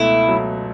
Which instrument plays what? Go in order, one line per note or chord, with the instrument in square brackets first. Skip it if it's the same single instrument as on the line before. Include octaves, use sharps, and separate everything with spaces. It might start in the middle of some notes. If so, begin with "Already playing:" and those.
Already playing: [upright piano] C#2 B2 A3 [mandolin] E4
[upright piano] F#3